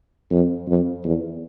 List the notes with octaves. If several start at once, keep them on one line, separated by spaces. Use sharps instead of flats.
F2
F2
E2